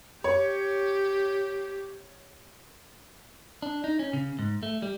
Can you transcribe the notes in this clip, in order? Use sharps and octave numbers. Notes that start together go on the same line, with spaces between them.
G4 C#5
D4
D#4
C#4
C#3
G#2
A3
G3